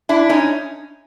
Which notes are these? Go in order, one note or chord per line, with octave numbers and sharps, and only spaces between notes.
D4 E4
C#4 D#4